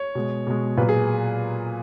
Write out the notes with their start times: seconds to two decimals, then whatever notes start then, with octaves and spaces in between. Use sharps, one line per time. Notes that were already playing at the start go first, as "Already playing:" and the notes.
Already playing: C#5
0.15 B2 G#3
0.47 B2 G#3
0.77 A#2 F#3 B4
0.89 G#4